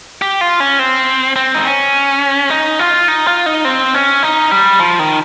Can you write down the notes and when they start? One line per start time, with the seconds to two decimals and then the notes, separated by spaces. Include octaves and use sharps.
0.22 G4
0.41 F4
0.60 C#4
0.79 C4
1.36 C4
1.54 D#4
1.65 C#4
2.51 D#4
2.79 F4
3.08 D#4
3.27 F4
3.46 D#4
3.65 C4
3.94 C#4
4.23 D#4
4.51 G3
4.80 F3
4.99 D#3